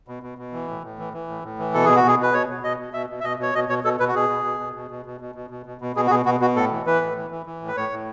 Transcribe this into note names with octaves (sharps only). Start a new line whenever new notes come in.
B2
B2
B2
E3
A2
A2
E3
E3
A2
A2
E3
B2 A4
B2 G#4
F#4
B2 G#4
B2 B4
B2 C#5
B2
B2 D#5
B2
B2 E5
B2
E5
B2 D#5
B2 C#5
B2 D#5
B2 C#5
B2 A4
B2 B4
F#4
B2 G#4
B2
B2
B2
B2
B2
B2
B2
B2
B2
B2
B2
B2 G#4
F#4
B2 G#4
B2 F#4
B2 F#4
A2 A4
E3
E3 B4
A2
E3
E3
E3
A2
B4
A2 C#5
A2